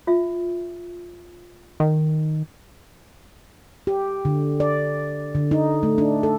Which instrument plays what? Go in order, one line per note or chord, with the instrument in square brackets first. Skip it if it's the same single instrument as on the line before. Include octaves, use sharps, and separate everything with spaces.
[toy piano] F4 E5
[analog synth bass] D#3
[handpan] G4
D3
D5
D3
D#4
A3
D4
A4